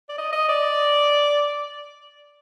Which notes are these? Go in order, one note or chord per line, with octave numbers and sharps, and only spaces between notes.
D5
D#5
D#5
D5